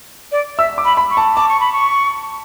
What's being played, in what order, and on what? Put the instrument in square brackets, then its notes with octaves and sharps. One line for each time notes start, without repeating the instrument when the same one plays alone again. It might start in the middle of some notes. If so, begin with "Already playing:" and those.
[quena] D5
[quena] E5 [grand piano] E6
[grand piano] D6
[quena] B5
[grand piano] B5
[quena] C#6
[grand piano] A5
[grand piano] A5 [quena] D6
[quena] C#6
B5
C#6